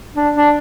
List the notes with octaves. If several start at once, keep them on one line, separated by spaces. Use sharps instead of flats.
D4
D4